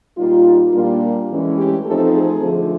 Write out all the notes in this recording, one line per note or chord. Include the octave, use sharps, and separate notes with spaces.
A#2 G3 A#3 D#4 F4
A#2 G3 A#3 D4 F4
A2 E3 G#3 C#4
G4
F3 A3 C4 D#4 A4
G#4
D3 F3 A3